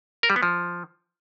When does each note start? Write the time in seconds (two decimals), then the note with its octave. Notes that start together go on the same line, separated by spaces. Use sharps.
0.23 A#4
0.30 G3
0.36 B3
0.43 F3